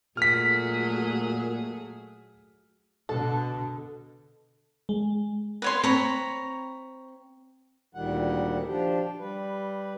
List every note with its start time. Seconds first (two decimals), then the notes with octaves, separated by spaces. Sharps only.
0.17 A#2 F#3 A3 G#4 F6 B6
3.09 B2 D3 A4
4.89 G#3
5.62 B4 C#5 C6
5.84 C4 C#5 A#5 B5
7.95 D2 A#2 D#3 G3 F#5
8.67 F3 D4 G4
9.19 G3 B4